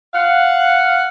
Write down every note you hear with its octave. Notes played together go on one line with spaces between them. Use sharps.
F5 F#5